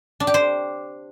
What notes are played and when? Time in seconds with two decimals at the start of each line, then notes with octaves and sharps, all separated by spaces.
0.20 D4
0.27 G4
0.34 C5